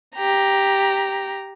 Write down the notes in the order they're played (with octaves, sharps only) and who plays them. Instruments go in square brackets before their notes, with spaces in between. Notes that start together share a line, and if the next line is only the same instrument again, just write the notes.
[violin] G4 A#5